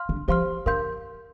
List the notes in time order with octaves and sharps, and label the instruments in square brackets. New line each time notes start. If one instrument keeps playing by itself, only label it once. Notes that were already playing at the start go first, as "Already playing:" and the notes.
Already playing: [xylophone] F5 C6 F6
[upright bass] D3
[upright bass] F3 [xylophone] G4 C5 F5 C6 F6
[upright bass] D3 [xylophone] A#4 F5 C6 G6